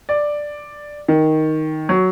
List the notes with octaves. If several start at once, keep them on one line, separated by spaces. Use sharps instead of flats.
D5
D#3
F#3